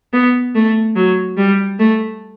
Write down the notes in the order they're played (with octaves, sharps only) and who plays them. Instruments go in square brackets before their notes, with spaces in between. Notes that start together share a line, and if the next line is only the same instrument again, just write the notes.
[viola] B3
A3
F#3
G3
A3